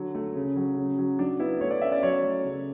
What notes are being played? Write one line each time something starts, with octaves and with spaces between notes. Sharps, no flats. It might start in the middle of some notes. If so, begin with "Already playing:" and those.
Already playing: D3 F#3
A3
C#3
F#3
C#3
F#3
F#3 D4
B3 E4
A3 C#5
D5
C#4 E5
D5
F#3 C#5
A3
C#3